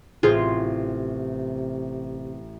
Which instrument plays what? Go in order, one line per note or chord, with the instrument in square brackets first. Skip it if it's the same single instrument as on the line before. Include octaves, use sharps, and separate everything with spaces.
[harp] A1 [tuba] C3 [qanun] F4 [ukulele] G#4 C5